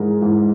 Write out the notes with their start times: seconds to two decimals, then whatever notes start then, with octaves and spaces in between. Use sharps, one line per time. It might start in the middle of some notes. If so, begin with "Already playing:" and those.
Already playing: G#2 E3 G#3 A#4
0.22 G#2 E3 G#3